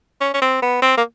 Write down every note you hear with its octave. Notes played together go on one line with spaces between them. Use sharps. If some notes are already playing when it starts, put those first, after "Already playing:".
C#4
C#4
C4
B3
C4
A#3